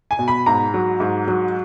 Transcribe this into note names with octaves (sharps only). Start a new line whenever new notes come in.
G#5
B2
B5
G#2 A#5
F#3
G#2
F#3